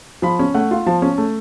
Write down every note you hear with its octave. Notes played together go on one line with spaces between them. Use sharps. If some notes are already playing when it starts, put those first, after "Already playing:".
F3 B5
C#4
A3 F#5
F4
F3 A5
C#4
A3